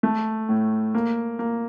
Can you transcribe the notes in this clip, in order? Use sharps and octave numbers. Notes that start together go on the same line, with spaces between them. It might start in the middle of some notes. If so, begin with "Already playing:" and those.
A3
A2
A#3
A#3